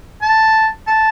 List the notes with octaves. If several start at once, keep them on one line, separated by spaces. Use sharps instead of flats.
A5
A5